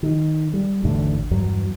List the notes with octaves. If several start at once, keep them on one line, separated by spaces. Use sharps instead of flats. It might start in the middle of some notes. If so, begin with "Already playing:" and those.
D#3
G3
G#1 E2 A2 D3
E2 G2 F#3